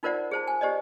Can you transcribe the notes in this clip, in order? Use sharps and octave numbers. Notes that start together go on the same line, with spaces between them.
D#4 F4 A#4 C5 D5 F#5
G#4 C5 A5
G#5
G4 C5 D5 D#5